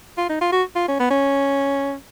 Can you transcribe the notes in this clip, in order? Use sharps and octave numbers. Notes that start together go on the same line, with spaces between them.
F4
D#4
F4
F#4
F4
C#4
B3
C#4